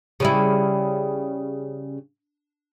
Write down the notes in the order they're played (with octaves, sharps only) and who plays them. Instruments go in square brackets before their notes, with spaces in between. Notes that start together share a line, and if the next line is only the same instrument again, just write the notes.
[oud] C#3 G3 E4